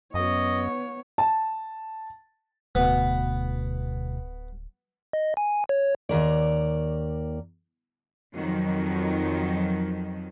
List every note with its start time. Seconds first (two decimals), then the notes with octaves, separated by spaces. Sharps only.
0.14 F#2 B3 C#5 D#5
1.18 A5
2.75 D1 D2 B2 B3
5.13 D#5
5.37 G#5
5.69 C#5
6.09 D#2 C3 A#4 D5
8.34 F2 D#3 F#3